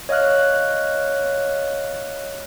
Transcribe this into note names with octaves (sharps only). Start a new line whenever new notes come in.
C#5 D#5 F5 F6 F#6